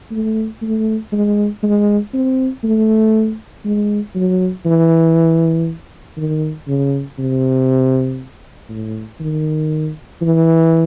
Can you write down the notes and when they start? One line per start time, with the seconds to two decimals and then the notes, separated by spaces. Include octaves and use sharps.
0.11 A3
0.62 A3
1.12 G#3
1.63 G#3
2.13 C4
2.64 A3
3.65 G#3
4.15 F#3
4.66 E3
6.17 D#3
6.68 C#3
7.19 C3
8.69 A2
9.20 D#3
10.22 E3